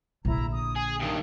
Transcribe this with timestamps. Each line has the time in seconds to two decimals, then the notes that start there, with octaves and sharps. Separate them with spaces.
0.25 A#1 D3 E4 A#5
0.53 D#6
0.76 G#4
1.00 G2 D#3